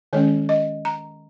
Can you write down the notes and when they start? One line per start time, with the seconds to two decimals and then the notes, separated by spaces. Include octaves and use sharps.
0.13 D#3 G#3 C#4 C#5
0.49 D#5
0.85 A#5